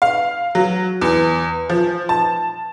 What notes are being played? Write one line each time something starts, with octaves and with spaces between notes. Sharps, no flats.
F5
F#3
E2
F3
A5